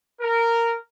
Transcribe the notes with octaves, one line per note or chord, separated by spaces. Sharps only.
A#4